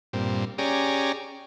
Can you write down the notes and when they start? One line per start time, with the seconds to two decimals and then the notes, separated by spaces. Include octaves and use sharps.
0.13 G2 A#2 C4
0.58 C#4 G4 G#4 D5 A#5